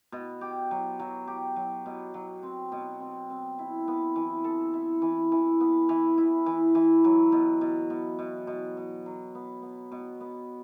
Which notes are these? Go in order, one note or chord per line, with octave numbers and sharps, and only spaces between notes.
B2
G4
F#3
F#3
G4
F#3
B2
F#3
C4
B2
C4
C4
E4
B3
E3
A4
E4
E3
E3
B3
E3
E4
E3
E3
F#3
B2
B2
B2
B2
B2
B2
F#3
B3
B3
B2
B3